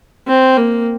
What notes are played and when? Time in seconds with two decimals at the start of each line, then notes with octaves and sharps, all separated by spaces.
0.27 C4
0.57 A#3